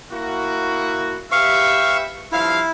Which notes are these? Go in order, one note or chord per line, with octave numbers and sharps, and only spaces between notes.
A#3 E4 F#4
G4 B4 E5 F5 C#6
G2 F3 E4 F5